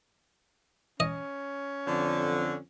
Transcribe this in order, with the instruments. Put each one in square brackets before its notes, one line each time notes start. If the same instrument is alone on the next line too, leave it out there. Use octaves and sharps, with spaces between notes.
[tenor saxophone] C#4 [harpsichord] D#5
[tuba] F2 [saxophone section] D3